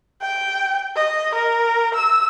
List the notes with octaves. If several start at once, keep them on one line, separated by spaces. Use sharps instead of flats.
G5
D#5
A#4
E6